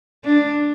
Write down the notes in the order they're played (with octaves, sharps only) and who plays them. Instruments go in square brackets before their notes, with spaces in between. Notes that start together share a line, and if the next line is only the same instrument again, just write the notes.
[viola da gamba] D4